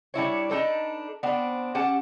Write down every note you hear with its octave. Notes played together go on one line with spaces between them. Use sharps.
G3 D4 E4 C#5
D4 D#4 A4 B4
B3 C4 D4
C#4 G4 F#5 A5